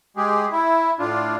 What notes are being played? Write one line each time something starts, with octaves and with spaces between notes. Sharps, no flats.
G#3 G4 G#4
E4
A2 D4 F4